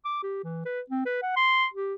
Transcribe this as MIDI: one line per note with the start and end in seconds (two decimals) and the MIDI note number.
0.05 0.22 86
0.23 0.41 67
0.43 0.61 52
0.65 0.80 71
0.89 1.02 60
1.05 1.20 71
1.22 1.32 78
1.36 1.66 84
1.73 1.94 67